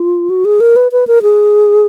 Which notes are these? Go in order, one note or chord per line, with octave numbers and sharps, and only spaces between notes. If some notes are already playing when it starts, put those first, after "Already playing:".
Already playing: F4
F#4
G#4
A#4
B4
B4
A#4
G#4